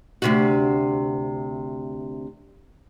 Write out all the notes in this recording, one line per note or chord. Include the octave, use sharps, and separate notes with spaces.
D2 C3 F#4